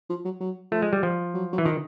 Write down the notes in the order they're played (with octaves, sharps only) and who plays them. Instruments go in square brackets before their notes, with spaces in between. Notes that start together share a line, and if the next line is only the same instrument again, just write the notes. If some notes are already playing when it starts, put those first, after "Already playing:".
[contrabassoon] F3
F#3
F#3
[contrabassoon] F3 [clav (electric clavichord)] A3
[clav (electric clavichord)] G#3
G3
F3
[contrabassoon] F#3
F#3
[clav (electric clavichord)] E3
[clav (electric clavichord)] D#3 [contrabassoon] F3